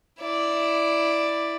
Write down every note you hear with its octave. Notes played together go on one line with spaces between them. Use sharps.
E4 D5